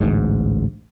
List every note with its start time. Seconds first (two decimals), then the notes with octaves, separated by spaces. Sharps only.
0.01 A1 D2 G#2